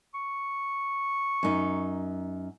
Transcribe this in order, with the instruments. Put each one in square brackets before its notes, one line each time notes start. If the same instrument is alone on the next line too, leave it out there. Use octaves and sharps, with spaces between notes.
[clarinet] C#6
[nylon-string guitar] F#2 D#4